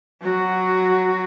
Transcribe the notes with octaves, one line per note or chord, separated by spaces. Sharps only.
F#3 F#4